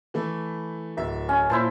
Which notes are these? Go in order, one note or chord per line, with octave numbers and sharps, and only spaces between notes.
E3 A3 E4
D1 E5
C#4
A#2 E4 C5 A5